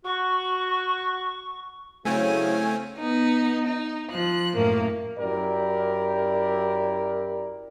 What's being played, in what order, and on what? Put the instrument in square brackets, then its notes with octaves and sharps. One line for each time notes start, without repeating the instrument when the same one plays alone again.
[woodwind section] F#4 [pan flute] C#6
[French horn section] C#3 F#3 E4 [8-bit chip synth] A3 C4 C#4 [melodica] G#5
[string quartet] B3 D#4
D#4
F3 F#6
[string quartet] F#2 A2 A#3 [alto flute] A#4
[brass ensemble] F#2 E4 G4 A#4 D5